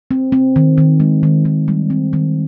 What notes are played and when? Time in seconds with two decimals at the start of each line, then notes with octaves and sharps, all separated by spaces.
0.11 C4
0.32 C4
0.56 D#3
0.78 D#3
1.00 G#3
1.23 D#3
1.45 D#3
1.68 G3
1.90 C4
2.13 D#3